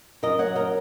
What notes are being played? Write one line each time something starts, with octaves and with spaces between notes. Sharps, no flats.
F#2 A#4 D#5
C#5 F#5
F#3
A#4 D#5